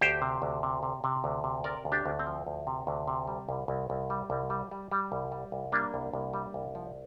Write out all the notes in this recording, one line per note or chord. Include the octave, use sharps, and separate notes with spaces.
D2 G4 C5
C3
D2
C3
C3
C3
D2
C3
C3 A#4 D5
D2
D4 G4
D2
C4
F3
D2
C3
D2
C3
G3
C2
C2
C2
G3
C2
G3
G3
G3
C2
G3
C2
G3 A#3 D4
C2
C2
G3
C2
F3